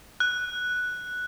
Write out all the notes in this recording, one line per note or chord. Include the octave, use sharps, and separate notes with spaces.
F#6